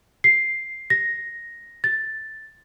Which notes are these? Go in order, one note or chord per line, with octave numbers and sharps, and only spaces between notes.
C7
A#6
A6